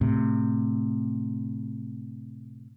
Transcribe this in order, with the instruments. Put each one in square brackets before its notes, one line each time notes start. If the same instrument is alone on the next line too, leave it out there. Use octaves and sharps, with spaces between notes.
[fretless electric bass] A2 C3